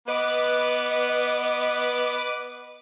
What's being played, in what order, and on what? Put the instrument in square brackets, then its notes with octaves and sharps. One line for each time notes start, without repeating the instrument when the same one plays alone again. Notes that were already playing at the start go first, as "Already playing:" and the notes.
[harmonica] B3 [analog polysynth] B4 D6 [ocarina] D#5